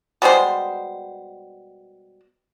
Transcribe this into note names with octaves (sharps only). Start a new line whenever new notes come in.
B2 G3 G#3 C5